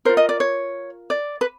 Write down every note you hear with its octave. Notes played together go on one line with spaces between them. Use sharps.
F4 A#4 C5
D#5
D5
C#5
D5
B4